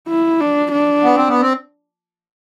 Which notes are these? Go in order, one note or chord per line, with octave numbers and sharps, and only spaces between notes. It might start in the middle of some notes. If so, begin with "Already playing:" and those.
E4
D4
D4
B3
C4
B3
C4